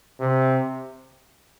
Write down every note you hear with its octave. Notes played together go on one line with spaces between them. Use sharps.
C3